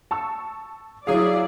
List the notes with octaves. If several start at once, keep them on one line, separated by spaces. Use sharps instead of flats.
A5 C#6 E6
F#3 E4 G#4 D5 F5